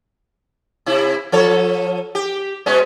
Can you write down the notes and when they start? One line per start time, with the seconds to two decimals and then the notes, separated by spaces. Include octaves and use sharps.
0.86 C3 E4
1.32 F3 A4 C#5
2.15 G4
2.66 B2 G#3 C#4